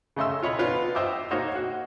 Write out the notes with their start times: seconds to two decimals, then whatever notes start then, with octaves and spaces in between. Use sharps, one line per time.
0.16 C#3 A3 D#5 C6 E6
0.42 F4 C#5 D#5 B5
0.59 B3 D4 F4 B4
0.95 C5 D#5 E5 G5 D6
1.31 A#3 D#4 F#4 C5 C#5
1.55 F#4